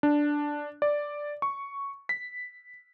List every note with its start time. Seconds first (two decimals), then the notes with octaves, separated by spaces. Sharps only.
0.03 D4
0.82 D5
1.42 C#6
2.09 B6